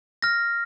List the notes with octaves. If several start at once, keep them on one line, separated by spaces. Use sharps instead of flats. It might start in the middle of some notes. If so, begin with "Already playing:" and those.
F6 A#6